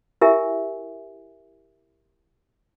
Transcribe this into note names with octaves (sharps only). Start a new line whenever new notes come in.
E4 G4 A#4 E5 G#5